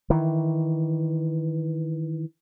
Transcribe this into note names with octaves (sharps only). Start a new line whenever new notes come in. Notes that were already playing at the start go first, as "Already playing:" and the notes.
D#3 E3